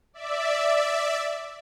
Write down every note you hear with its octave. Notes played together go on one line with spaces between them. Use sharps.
D5 E5